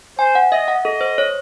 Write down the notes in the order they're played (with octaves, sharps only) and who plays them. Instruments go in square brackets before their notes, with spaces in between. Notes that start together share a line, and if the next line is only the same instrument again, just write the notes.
[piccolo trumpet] C5 [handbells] G#5
[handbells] F#5
[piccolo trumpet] D#5 [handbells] E5
[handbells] F#5
[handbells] A4 [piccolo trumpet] D#5
[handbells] C5
C#5